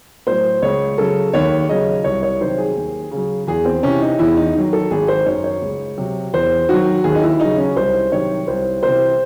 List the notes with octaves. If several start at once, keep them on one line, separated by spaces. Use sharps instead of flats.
A2 F#3 C5
C#2 C#5
C#3 F#3 A4
D#2 C#5
C#3 F#3 D#5
C2 C#5
C#5
C3 D#3 F#3 C5
G#4
D#2
C#3
F#3
E2 G#4
C4
C3 E3 C#4
D#4
E2 E4
D#4
D#3 F#3
A4
G#1 G#4
C5
F#2 D#3 F#3 C#5
C#5
C#2
C3 F#3
E2 C5
D#3 F#3 F#4
D#2 G#4
D#4
E4
C#3 F#3 D#4
C#4
C2 C5
C3 D#3 F#3 C#5
C2 C5
C3 E3 C5